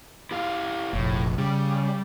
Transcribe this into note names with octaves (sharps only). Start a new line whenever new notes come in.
E4 G4 F5
F1 A#1 A2
C#3 G3